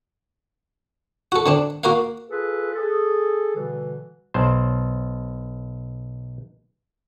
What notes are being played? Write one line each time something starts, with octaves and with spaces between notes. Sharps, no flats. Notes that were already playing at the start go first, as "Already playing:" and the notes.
F#4 A4
D3 C4 D4
A#3 F#4 A#4 F5
F4 G#4 A4 B4
G#4 A4
B2 D3 E3 G3
B1 C5